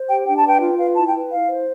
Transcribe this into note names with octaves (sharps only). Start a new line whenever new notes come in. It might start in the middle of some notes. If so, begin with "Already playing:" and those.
Already playing: C5
G4 G5
D4 G5
A5
B4 G5
F4
B4 F5
E4 A5
G5
B4
E4 F5
C5